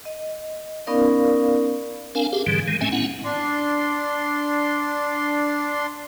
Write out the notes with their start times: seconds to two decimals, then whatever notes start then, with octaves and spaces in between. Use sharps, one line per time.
0.05 D#5
0.87 B3 C#4 D#4 A#4 D5 F5
2.15 C4 D4 A#4 F5 G#5
2.33 G4 G#4 F5
2.47 G#2 D3 E3 G3
2.68 D#3 G#3
2.81 A2 A3 C4 C#4 E5 G#5
2.92 B3 C#4 E4 F#5
3.25 D4 C6